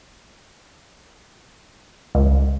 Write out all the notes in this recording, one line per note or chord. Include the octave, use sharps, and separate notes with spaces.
C#2